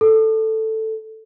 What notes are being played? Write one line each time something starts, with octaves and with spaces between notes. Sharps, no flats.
A4